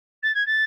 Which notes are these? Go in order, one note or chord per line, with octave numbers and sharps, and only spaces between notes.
A6
G#6
A6